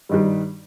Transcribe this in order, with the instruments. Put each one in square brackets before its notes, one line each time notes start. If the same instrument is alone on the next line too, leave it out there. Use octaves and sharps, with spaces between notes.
[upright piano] G2 D#3 G3